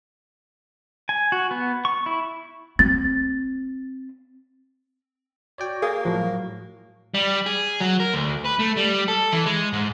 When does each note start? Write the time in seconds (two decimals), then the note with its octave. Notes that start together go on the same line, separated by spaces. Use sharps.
1.09 G#5
1.32 F#4
1.51 B3
1.85 C#6
2.06 E4
2.79 C4 A6
5.58 F#4 C#5 D5 G5
5.82 A#3 G#4
6.05 A2 F3 F#3
7.14 G3
7.46 G#4
7.80 F#3
8.00 A#4
8.13 D2
8.44 B4
8.59 A3
8.77 G3
9.08 A4
9.32 E3
9.46 G#3
9.73 G#2